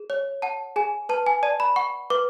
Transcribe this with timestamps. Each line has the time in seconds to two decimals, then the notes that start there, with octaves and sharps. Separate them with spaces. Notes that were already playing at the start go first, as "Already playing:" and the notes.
Already playing: G#4
0.10 C#5
0.42 F#5 A5
0.76 G#4 G#5
1.09 B4 A5
1.27 G#5
1.43 D5 A5
1.60 B5
1.76 F#5 C#6
2.10 B4 D6